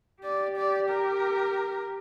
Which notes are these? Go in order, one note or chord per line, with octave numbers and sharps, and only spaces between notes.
G4 D5
D5
A#4